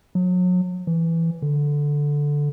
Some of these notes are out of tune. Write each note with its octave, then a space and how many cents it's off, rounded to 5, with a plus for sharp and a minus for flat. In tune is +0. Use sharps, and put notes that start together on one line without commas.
F#3 -35
E3 +5
D3 -5